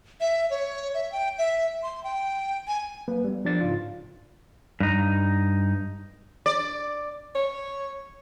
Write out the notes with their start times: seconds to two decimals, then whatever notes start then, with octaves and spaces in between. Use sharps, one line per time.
0.21 E5
0.50 C#5
0.94 E5
1.12 G5
1.38 E5
1.83 C6
2.04 G5
2.67 G#5
3.08 F#3 A#3 B4
3.24 G3 B3
3.45 F3 D4 D5 A6
3.61 G#2 C#3 D#4 F4
4.80 G2 D#4
6.46 D5
7.35 C#5